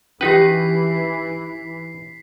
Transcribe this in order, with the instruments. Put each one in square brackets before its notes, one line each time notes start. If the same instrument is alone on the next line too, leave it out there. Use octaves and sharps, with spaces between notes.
[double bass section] E3 [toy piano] C#4 F#4 G4 [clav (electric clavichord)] D#4 B4 [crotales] B6 C7